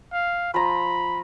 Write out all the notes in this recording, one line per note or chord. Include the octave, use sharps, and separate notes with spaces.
F5
F3 A#5 B5